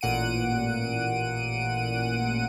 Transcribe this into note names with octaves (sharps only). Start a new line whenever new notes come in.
A1 A#2 F#5 D7 D#7